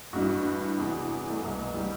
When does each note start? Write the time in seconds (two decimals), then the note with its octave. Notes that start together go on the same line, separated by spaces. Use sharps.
0.13 A1 G2 E3 F#4
0.78 E2 C3 E3
1.30 A3
1.42 C2 B2 B3
1.58 B3
1.74 G3